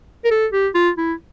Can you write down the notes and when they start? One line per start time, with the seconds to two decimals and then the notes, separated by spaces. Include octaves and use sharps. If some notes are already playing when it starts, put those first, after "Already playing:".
0.24 A#4
0.31 A4
0.53 G4
0.75 F4
0.98 E4